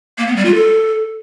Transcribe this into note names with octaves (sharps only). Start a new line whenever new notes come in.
A#3
B3
G3
F4
A4